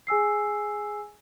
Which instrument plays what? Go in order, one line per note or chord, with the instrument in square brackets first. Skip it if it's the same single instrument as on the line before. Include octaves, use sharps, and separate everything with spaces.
[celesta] G#4 G#5 E6 C7